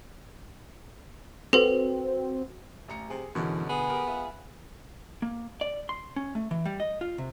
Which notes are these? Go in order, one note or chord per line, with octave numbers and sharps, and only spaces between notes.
C4 F#4 A4 B4
A1 A#5 C#7
C3 G#4
F#2 B2 D3 E3 G#3
B3 G#4
G4 A#4
F4 E5
A#3
D5
C6
C#4
A3
E3
G3
D#5
F4
C3